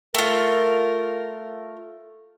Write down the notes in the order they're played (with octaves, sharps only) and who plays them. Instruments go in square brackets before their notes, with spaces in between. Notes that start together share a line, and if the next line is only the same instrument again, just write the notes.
[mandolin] A3 F4 [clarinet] A#4